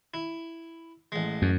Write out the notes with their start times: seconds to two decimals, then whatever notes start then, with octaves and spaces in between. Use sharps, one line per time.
0.14 E4
1.12 A1 G#3
1.42 F#2